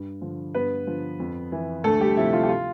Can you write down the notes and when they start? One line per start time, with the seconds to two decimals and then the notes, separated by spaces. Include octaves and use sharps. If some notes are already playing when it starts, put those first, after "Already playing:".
Already playing: G2
0.21 D3 F3
0.55 G2 B3 B4
0.87 D3 F3
1.20 F2
1.52 E3
1.84 D2 A3 A4
2.00 G3 G4
2.16 C3 F3 E4
2.33 F4
2.43 G4
2.49 F4